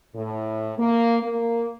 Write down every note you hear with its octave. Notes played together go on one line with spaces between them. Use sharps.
A2
A#3
A#3